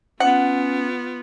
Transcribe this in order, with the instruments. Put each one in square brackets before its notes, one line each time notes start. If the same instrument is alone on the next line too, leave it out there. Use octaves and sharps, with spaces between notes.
[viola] B3 F4 [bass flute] C#4 [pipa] F#5